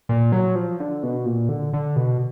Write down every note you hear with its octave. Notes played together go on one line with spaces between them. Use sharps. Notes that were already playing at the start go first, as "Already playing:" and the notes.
A#2
F#3
F3
D3
B2
A#2
D3
D3
B2